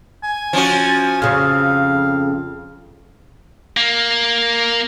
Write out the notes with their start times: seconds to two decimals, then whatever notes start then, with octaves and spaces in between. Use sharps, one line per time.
0.23 G#5
0.53 F3 C#4 F#4
1.22 F2 C#3 F5
3.77 A#3